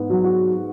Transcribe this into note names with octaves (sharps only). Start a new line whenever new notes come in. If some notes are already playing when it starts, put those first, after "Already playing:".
Already playing: G#2 B3
F#3
F#4